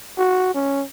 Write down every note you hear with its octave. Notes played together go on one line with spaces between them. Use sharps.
F#4
C#4